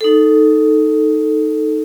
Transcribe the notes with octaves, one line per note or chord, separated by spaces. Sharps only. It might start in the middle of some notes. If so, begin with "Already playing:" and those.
D#4 A4